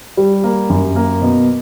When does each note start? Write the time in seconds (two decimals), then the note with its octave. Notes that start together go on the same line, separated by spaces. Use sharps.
0.17 G3
0.44 A#3
0.70 F#2
0.96 A#3
1.22 B2